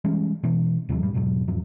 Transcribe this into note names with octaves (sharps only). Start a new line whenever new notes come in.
E3 G3 G#3 C#4
B2 E3
D#2 C3 E3 F#3
F1 F#2 A2 G3
E2 G#2 B2 F#3
E2 G#2 F3 F#3